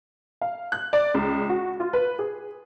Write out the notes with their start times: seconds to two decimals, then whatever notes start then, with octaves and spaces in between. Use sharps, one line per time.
0.41 F5
0.72 F#6
0.93 D5
1.14 C#2
1.49 F#4
1.80 F4
1.93 B4
2.19 G#4